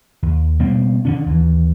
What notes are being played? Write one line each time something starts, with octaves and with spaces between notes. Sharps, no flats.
D#2
B2 G3 A#3 C4
D3 D#3 C#4 D4
D#2 E3